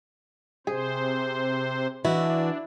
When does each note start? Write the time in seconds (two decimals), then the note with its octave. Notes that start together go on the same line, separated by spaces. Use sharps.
0.67 C3 G#4 C5
2.05 E3 D4 E4 F#4